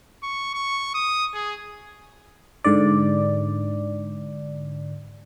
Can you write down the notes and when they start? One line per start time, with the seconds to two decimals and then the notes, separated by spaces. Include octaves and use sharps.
0.23 C#6
0.54 C#6
0.94 D#6
1.34 G#4
2.64 G#2 D3 D5